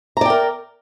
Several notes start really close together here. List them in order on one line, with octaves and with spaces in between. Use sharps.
A#5 D5 G5 A#4